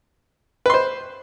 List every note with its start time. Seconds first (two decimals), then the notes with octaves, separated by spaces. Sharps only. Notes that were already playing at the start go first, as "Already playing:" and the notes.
0.66 B4
0.70 C6
0.74 C5